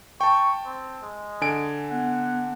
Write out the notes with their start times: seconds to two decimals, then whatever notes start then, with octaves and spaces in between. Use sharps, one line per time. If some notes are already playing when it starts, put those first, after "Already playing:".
0.21 G5 A5 C#6
0.65 C4
1.03 G#3
1.41 D3 G#5 D7
1.91 B3 F#5